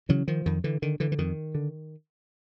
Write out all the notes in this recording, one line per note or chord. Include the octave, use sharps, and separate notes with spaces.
C#3 E3 F#3
D#3 F3
F2 D#3
D3 E3
D3 D#3
D3 E3
E3
F2 D#3
D3